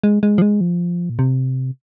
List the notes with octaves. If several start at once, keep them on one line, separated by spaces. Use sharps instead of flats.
G#3
G#3
F3
G#3
F3
A#2
C3